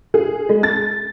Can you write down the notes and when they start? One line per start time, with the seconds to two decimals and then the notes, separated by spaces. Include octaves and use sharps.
0.14 G#4
0.49 G#3
0.63 A6